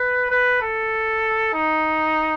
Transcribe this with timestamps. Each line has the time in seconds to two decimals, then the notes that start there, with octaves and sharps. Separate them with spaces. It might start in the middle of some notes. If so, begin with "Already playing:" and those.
Already playing: B4
0.31 B4
0.62 A4
1.54 D#4